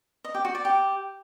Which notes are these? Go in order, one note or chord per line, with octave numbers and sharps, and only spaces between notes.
D#5
G4
F#4
D5
G4